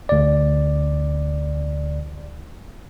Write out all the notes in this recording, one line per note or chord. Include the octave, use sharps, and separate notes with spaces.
D2 D5